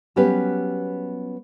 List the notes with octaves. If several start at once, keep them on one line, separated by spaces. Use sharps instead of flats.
F#3 G3 B3 C#4 G4 B4